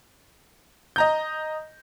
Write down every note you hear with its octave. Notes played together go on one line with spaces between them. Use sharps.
D#5 A#5 G6